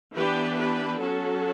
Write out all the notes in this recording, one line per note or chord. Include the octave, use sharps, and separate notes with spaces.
E3 B3 D4 G4 B4
G4 B4
F#3 C#4 F#4 A4